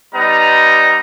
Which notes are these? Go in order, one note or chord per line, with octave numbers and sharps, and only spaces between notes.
G3 B3 D#4 A#5